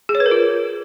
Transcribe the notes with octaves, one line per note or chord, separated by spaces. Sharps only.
G#4
C#5
B4
A#4
F4